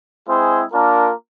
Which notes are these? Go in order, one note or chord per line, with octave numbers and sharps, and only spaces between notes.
G#3 C4 E4 G#4 C5
A#3 D4 F4 A#4